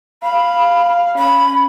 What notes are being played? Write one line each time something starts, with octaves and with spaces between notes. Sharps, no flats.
F5 B5
C#4 B5